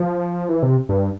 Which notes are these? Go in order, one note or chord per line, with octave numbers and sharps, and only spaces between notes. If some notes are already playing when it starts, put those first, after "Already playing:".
Already playing: F3
E3
C3
G2